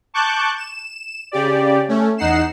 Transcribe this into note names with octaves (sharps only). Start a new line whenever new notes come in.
A5 C#6 D6 F#6 G6
E7
C#3 G4 D5
A3 C#4
E2 D#4 F#5 C7 E7